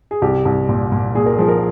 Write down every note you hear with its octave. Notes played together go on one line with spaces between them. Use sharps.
G#4
C2 G4
C2
A#2
A#2
A#2 G#4
A#4
F3 G#4
A#4